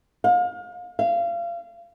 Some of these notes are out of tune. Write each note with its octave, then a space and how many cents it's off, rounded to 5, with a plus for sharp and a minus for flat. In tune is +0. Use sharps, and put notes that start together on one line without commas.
F5 +35
F5 -30